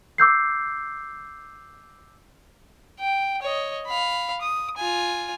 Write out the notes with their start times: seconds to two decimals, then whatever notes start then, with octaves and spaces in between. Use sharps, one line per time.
0.18 D6 E6 G6 C7
2.99 G5
3.42 C#5 D#5
3.87 F5 B5
4.41 D#6
4.77 F4 G#5